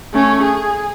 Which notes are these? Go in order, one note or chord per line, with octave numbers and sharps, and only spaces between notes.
A3 C#4
G#4